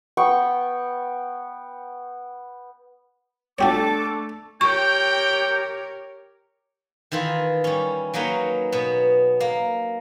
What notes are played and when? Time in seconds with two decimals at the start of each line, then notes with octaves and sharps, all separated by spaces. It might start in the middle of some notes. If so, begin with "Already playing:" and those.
0.17 B3 G5 C#6
3.59 A3 D4 F#4 G4 A4 C#5 D6
4.61 G4 A#4 C#5 G5 C#6
7.12 D#3 E3 E4 F4
7.64 G3 C#4
8.14 F#3 A#3 D#4 B4 C#5
8.72 B2 B3
9.40 A#3